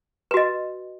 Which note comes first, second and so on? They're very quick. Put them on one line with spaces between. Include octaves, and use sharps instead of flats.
B4 F#4 D#5